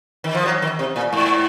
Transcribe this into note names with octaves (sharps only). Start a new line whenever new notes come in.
D#3
F3
F#3
D#3
C3
A#2
G#2